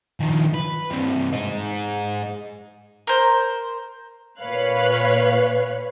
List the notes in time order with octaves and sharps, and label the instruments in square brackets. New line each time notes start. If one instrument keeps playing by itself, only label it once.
[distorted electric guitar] D#3 F3
B4
G2 C3
G#3 D#4
[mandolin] A#4 C5
[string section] A#2 B4 C#5 F5 F#6